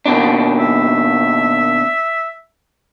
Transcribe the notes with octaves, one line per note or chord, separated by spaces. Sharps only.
D#2 B2 D4
E5